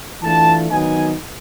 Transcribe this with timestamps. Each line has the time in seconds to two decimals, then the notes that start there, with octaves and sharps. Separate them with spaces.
0.22 E3 A3 D4 F4 A5
0.70 D#3 F#3 B3 D#4 G#5